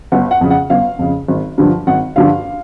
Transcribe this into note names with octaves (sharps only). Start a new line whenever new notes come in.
G1 F#5
F#5
F2 C#3
F#5
G1 F5
F2 C#3
G#1
G2 D3 F3
G#1 F#5
G2 D3 F3 F5